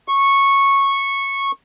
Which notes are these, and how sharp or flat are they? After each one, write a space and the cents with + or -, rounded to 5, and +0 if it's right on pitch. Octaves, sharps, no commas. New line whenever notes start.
C#6 -10